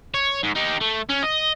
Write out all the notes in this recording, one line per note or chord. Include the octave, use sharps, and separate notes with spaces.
C#5
G#2
D#4 G4
A3
C#4
D#5